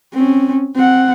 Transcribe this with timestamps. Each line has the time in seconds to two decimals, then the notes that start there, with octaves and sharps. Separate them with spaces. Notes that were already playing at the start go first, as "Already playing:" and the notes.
0.14 C4 C#4
0.76 C4 F#5